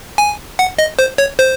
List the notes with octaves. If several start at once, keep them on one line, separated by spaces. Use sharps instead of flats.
G#5
F#5
D#5
C5
C#5
C5